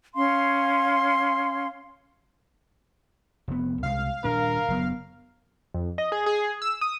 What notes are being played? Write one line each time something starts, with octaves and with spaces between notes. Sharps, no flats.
C#4 F5 C6
F1 B3
C2 G#3 F5
D#1 A#2 D4 A#4
F#1 F#3 B3
F2
D#5
G#4
G#4
E6
D#6